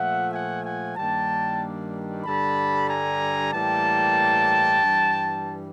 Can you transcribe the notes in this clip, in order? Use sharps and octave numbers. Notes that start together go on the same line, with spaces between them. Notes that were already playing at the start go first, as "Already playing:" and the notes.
Already playing: A#2 F3 A3 E5 F#5
F#5 G#5
F#5 G#5
G2 D#3 G3 A#3 D4 G5 A5
G2 D3 G3 A5 B5
G#5 A#5
A2 E3 G3 A#3 G5 A5
G2 E3 G3